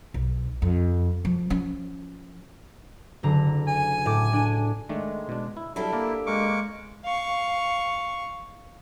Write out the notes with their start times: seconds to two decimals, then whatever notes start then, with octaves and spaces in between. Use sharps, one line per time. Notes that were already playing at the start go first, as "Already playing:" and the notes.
0.14 B1
0.62 F2
1.25 F3
1.50 F3 C#4
3.23 F#1 D3 A#5
3.68 G#5
4.06 A2 D6
4.33 D4
4.89 D#3 G#3 A3 D4
5.29 B2 D4
5.57 E4
5.76 F#3 G3 D4 E4 G4 A4
5.93 A#3 A#4 D5
6.26 G#3 A#3 C#6 D6
7.05 F5 C#6